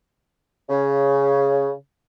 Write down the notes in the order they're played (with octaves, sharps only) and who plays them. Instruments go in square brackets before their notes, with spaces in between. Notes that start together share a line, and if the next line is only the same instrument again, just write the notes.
[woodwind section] C#3